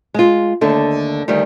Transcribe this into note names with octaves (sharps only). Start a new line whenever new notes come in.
G#3 F4
D#2 D3 A3 A4
D2 D#3 G3